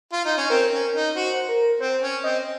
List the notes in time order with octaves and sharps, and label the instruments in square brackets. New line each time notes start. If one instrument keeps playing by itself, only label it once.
[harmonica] F4
D#4
C#4
[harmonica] C4 [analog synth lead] A#4
[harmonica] C#4
D#4
[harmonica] F#4 [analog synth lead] C5
[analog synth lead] A#4
[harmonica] C4 [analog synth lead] C5
[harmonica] C#4
[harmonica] C4 [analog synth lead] D#5